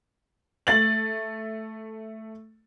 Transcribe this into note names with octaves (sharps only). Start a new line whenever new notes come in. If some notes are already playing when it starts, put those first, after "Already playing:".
A3 A6 F#7